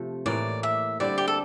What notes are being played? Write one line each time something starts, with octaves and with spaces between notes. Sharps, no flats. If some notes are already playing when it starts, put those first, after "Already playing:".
Already playing: C3 F3 A3
A2 E3 A#3 D5
E5
D3 G3 C4 E4 D5
G4
A4